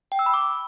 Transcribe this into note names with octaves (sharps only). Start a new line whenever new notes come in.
G5
E6
B5
D6